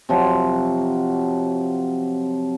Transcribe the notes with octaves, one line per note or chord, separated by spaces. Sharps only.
C3 F3 F#3